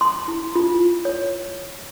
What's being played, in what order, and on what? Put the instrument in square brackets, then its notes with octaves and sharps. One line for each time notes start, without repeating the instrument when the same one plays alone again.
[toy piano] C6
E4
F4
C#5